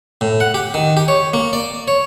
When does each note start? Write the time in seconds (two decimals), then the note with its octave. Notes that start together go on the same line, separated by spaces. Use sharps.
0.21 A2
0.40 F#5
0.54 G4
0.74 D#3
0.97 G4
1.08 C#5
1.33 A#3
1.53 D5
1.88 C#5